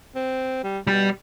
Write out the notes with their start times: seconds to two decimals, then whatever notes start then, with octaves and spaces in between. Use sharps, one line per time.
0.15 C4
0.64 G3
0.87 B2 G3 G4